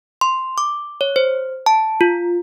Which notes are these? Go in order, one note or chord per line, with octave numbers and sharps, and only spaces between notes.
C6
D6
C#5
C5
A5
F4